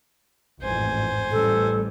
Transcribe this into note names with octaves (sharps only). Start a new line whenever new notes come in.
A1 F2 G#2 C5 G#5
A1 G3 A4